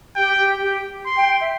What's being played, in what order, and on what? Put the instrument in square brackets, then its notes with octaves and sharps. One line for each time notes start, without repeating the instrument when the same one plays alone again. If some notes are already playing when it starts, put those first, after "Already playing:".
[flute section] G4 [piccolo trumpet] G5
[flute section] G4
G4
[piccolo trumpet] C6
[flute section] G5
G5
E5